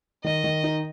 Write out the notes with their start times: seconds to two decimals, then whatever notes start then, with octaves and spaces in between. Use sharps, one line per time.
0.24 D#3 D#5
0.44 D#3
0.64 D#4